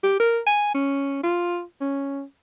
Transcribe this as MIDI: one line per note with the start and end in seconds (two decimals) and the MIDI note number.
0.04 0.18 67
0.20 0.40 70
0.47 0.74 80
0.75 1.21 61
1.23 1.62 65
1.81 2.22 61